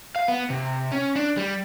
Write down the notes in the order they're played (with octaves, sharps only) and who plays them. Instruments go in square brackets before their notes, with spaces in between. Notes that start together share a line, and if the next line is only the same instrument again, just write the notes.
[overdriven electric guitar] F5
B3
C3
C#4
D4
G3